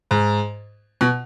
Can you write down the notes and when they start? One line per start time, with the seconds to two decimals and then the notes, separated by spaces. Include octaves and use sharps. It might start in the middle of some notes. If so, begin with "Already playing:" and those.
0.11 G#2
1.01 B2